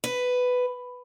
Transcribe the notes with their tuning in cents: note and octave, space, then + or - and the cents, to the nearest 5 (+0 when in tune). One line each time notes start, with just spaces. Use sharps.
B4 +10